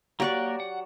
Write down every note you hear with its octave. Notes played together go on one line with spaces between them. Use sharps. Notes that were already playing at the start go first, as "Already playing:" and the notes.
F#3 A#3 G4 A#4 D5 C#6 F#6
F#5